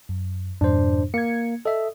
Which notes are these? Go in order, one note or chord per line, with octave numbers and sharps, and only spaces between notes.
F#2
F2 G#2 B2 D4 C5
A#3 G#6 C#7
A4 D#5 E5